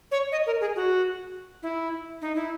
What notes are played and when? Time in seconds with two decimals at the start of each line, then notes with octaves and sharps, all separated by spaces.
0.11 C#5
0.32 D#5
0.46 A#4
0.61 G#4
0.76 F#4
1.63 E4
2.22 D#4
2.35 E4